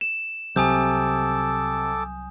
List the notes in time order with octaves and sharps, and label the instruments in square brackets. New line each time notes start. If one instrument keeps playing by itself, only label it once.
[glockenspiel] E7
[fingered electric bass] C2 F#3 [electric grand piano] C3 [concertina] A4 D6 [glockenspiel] G#5 D#6 G6